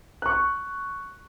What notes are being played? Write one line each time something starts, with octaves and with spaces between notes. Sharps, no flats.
C#6 F#6